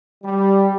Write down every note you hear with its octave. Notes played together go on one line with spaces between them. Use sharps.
G3